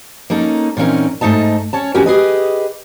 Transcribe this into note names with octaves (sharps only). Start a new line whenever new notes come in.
A#3 C#4 D#4 A4
A#2 E3 C4 C#4 D#4 A#4
G#2 A3 D#4 D#5 A5
C#4 C#5 A5
E2 C#4 E4 F#4 G4 A#4
G4 G#4 B4 D#5